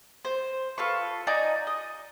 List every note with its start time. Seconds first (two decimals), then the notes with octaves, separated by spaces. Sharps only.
0.25 C5
0.78 F4 A4 B4 C#6
1.27 D#4 D5 G#5 A#5
1.67 D#5